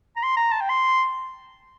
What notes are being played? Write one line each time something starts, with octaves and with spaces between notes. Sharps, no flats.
A#5
C6
A#5
A5
G5
C6